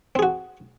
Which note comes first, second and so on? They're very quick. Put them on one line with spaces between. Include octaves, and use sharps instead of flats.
C4 G#4 F#4